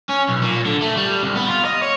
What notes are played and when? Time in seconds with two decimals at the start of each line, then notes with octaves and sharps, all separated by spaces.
0.09 C#4
0.29 B1
0.42 A#2
0.66 D3
0.82 A3
0.97 G3
1.23 C2
1.36 B3
1.48 F4
1.65 D#5
1.82 C#5